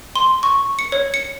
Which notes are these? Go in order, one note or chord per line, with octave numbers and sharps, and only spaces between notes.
C6
C#6
C#7
C#5
C#7